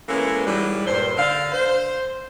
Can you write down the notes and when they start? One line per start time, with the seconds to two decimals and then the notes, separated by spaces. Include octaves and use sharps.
0.08 E3 G#3 A#3 B3 C#4 A4
0.46 G#2 E3 F#3 G3
0.86 G2 A#2 C5
1.17 D3 F5
1.52 C5